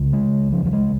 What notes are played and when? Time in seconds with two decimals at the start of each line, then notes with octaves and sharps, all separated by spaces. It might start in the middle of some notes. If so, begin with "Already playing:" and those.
Already playing: C#2 C#3
0.13 G#3
0.53 F3
0.65 F3
0.73 G#3